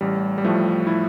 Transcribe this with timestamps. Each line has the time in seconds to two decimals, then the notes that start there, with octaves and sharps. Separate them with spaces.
0.01 A1 G3
0.38 G3
0.44 A2 F3 A3
0.87 E4